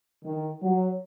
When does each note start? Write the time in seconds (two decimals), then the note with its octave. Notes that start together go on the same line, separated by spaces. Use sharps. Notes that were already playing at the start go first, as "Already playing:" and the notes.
0.25 D#3
0.63 F#3